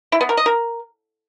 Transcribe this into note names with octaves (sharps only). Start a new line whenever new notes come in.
E4
B3
A#4
D#5
A#4